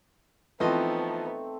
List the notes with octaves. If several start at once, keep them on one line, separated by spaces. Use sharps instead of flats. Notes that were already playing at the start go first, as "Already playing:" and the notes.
E3 F3 A3 B3 C4 D#4 D#5